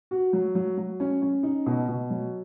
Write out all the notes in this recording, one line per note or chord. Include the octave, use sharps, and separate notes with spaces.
F#4
F#3
F#3
F#3
C#4
C#4
D#4
B2
B2
F#3